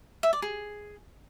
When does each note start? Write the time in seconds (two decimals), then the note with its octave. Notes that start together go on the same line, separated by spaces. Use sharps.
0.23 E5
0.33 D5
0.42 G#4